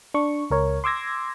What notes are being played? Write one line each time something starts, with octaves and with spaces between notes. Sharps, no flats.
D4 C#6
C#2 A#4 C#5
C6 D6 E6 G#6 A#6